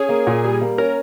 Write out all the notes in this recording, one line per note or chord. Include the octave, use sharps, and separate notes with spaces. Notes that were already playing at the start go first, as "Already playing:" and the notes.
Already playing: C#4 G#4
A#3
A#2
G3
A#3
C#4 A#4